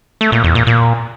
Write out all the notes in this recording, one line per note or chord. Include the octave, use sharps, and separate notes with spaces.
A3
A#2
E2
A#2
A#2